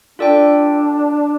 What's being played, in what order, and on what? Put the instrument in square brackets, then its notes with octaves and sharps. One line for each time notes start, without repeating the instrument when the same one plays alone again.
[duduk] D4 [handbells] F4 A4 D5 G5